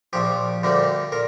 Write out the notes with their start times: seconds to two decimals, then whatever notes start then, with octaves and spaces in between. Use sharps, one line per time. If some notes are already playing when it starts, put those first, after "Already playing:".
0.13 A#1 A#2 F3 G4
0.63 D2 D3 G3 A#3
1.12 A#2 A#4